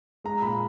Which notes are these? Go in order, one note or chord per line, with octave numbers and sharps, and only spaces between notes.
G#3 A#5
A#2 B5